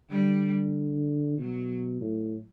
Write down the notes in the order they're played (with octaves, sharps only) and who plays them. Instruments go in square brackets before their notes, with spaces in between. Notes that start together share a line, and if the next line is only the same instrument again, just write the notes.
[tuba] D3 [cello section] G3
[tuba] B2 [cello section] F#3
[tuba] A2